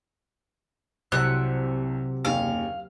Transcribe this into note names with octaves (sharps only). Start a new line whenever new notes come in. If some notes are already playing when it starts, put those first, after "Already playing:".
C2 C3 F#3 E5 F#5 E6 F#6
F#1 D#2 C#4 F5